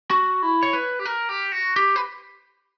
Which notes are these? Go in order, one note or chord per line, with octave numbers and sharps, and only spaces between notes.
F#4
E4
C#5
B4
G4
A#4
G4
F#4
G4
B4